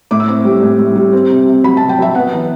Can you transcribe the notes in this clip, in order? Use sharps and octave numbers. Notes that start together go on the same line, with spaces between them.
A2 D6
E6
C4 D6
G3
A2
G3
G3
C4
C3
C3
F#3 B5
C3 A5
G5
F#3 E5
B3 F#5
E3